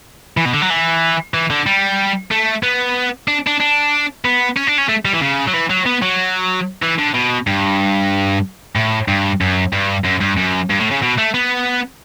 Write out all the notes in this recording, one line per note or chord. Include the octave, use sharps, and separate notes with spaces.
E3
B2
D3
F#3
E3
E3
D3
G3
A3
B3
D4
D4
D4
B3
C#4
D4
C#4
A3
G3
E3
C#3
F#3
E3
F#3
B3
F#3
E3
D3
B2
G2
A2
G2
F#2
G2
F#2
G2
F#2
G2
A2
C#3
B2
A3
B3